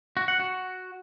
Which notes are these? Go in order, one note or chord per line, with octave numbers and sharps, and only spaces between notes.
F#4
F#5
F#4